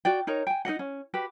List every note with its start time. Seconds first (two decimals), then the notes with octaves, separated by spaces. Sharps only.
0.05 F#4 D5 G5
0.27 D#4 A#4 C#5 A#5
0.47 G5 G#5
0.65 D#4 A#4 D#5 F#5
0.79 C#4
1.14 F#4 G4 B4 G5